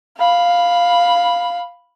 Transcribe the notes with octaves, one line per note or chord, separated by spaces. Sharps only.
F5 B5